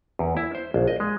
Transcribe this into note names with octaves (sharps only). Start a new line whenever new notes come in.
E2
E4
C5
A#1
D#5
G#3